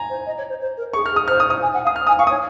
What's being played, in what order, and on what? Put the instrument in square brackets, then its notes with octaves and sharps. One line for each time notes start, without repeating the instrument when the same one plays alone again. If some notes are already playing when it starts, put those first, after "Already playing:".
Already playing: [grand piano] G#5 A#5
[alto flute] C5
D#5
C#5
C5
C5
A#4
[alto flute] G#4 [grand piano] C#6
[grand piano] F6
[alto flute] G#4
[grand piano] D#6
[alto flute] C5 [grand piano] F6
[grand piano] D#6
D#6
[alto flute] G#5
F#5
F5
[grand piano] D#6
F6
[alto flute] G#5 [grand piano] D#6
[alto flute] F5 [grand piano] C#6
[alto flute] C#5 [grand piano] D#6